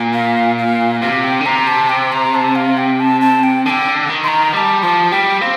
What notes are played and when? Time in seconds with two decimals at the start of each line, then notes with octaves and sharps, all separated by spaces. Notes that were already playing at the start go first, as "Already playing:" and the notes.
Already playing: A#2
0.13 F5
0.58 F5
1.01 C3 F5
1.24 G5
1.41 D3
1.46 C3 A#5
1.67 A5
1.89 G5
2.12 A#5
2.34 A5
2.55 F5
2.77 G5
3.00 A5
3.21 A5
3.43 G5
3.65 D3 G5 A5
4.09 D#3
4.23 C6
4.28 A#5
4.53 G3 A5 A#5
4.82 F3 A5
5.11 G3 G5
5.41 C4 F5